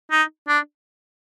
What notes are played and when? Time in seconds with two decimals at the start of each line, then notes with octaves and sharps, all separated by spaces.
0.11 D#4
0.48 D4